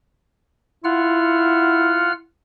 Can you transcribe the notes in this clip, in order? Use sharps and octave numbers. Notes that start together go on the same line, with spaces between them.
E4 F4 F#5 F6